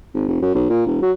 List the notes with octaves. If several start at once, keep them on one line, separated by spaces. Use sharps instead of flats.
G#1
F1
F#2
B1
A#2
E1
F#3